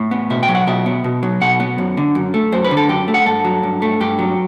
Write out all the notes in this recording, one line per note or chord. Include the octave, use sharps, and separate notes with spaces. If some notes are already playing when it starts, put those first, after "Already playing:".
Already playing: A2
B3
B2 E5
G5
F#3
F#5
B2 E5
B3
B2
F#3
B2 F#5
B3
F#2
D3
F#2
A3
F#2 C5
B4
D3
A4
F#2 G4
A3
F#5
G2 A4
F#3
G2
A3
G2 G4
F#3